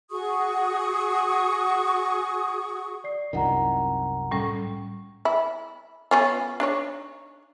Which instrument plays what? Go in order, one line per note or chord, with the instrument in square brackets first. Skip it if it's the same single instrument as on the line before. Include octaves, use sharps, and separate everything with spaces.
[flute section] F#4 G#4 C#6 D#6
[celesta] D5 C7
[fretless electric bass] C2 F#2 D#3 [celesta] F4 F#5 A#5
[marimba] A2 G3 C#4
[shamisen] E4
B3 C#4 F4
D4 D#4 C#5